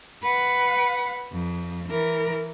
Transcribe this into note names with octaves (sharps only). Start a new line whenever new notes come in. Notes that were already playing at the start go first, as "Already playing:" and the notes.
B4 F#5
F2
E3 A#4